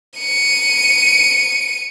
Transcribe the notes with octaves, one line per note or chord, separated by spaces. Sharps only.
C#7 D#7